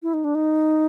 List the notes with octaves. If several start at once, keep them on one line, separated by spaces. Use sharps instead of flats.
E4
D#4
D4
D#4